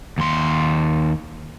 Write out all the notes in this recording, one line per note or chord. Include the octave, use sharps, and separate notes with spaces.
D#2 C6